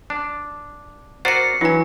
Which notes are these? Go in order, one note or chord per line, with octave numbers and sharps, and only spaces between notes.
D4
F#4 A#4 C5 D5 F#5 C7 C#7
E3 F#3 D4 G#5